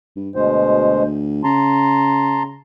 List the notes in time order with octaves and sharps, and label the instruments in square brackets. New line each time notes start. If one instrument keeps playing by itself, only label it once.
[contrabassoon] G2
[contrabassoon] D2 [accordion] B2 G#3 C5
[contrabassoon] C#3 [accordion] A5 A#5 C6